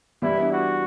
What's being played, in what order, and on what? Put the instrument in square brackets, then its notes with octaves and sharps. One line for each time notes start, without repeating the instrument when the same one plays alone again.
[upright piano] E3 G3 [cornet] E4
[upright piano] B3 D4
[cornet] F#4